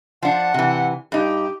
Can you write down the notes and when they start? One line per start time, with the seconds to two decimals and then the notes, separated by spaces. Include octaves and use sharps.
0.23 F3 D4 F#5
0.54 C3 E3
1.12 G2 D#4 G4